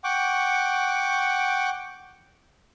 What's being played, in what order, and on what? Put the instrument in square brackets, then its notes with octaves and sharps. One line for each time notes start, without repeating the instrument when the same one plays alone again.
[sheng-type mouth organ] F#5 G5 C#6 D6